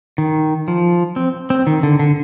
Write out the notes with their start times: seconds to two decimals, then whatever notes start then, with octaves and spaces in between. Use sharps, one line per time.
0.18 D#3
0.68 F3
1.16 C4
1.50 C4
1.67 D#3
1.83 D3
1.99 D3